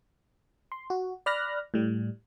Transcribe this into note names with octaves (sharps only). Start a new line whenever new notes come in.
C6
F#4
D5 B5 F6 F#6 A#6
A2 G3